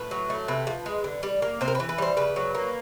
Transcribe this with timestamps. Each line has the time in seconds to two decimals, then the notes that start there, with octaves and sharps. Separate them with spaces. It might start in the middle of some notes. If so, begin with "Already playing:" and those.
Already playing: A2 B4
0.11 F#3
0.30 A3
0.48 C3 B4
0.67 F3
0.86 G#3
1.04 D3
1.23 G3
1.42 A#3
1.61 C3 C5
1.68 A#4
1.75 B4
1.80 E3
1.89 B4
1.98 G3 C5
2.17 C#3 B4
2.36 F#3
2.55 A#3